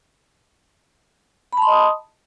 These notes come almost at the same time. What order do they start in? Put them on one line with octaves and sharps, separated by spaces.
B5 A5 C6 D#5 D#6